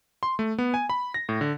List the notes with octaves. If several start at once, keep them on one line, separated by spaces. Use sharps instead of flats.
C6
A3
B3
G#5
B5
A#6
A2
D3